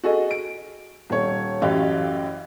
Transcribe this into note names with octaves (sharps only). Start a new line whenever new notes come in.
F#4 G#4 A4 D#5
D7
D#1 C#5
A1 F#2 E3 G4 F5